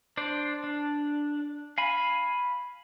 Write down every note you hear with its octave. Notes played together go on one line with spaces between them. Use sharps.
D4 C5 D5
D4
F5 G#5 B5